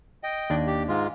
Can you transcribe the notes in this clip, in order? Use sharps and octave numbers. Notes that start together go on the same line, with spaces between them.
D#5 G5
D#2 D4
G4
G#2 G#3 F4